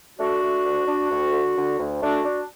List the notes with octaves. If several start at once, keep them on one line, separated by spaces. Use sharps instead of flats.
A3 D4 F#4
A3
D2
D4
D2
D3
D3
D2
A3 D4 F#4
D4